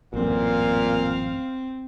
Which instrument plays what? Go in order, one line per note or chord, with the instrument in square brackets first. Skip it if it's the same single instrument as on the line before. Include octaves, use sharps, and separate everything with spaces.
[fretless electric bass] A1 F#2 [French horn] A#2 [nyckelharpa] C4 [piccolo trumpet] F5